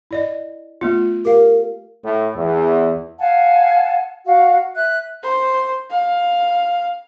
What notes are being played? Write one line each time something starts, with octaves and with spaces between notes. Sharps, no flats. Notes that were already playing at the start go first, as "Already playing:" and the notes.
E4 D5 D#5
A3 B3 F4
G4 A#4 F5
A2
E2
F5 F#5 G#5 A5
F#4 F5
E5 F#6
C5
F5